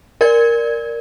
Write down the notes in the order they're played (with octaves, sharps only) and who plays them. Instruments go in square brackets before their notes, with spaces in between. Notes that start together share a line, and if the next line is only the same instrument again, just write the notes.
[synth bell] A#4 D5 G#6